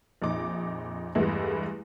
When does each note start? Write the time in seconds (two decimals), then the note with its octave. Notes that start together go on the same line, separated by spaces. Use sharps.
0.22 A#1 F2 D#4 D6
1.15 E2 G2 G#3 A3 B3 E4